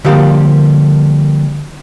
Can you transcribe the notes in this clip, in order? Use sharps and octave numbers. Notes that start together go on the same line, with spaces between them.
D3 F3 G3 A#3 G4 F5